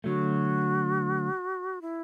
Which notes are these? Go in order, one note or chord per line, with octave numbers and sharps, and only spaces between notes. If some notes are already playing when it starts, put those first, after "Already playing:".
D3 F#3 A3 F#4
E4